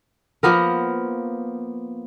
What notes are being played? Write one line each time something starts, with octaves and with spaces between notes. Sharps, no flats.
F3 A#3 B3 A#4